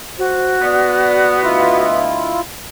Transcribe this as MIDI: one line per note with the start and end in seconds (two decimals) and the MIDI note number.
0.18 1.87 66
0.18 0.56 72
0.62 2.06 59
0.62 1.38 74
1.43 2.40 38
1.43 2.40 64
1.43 2.40 65
1.43 2.40 75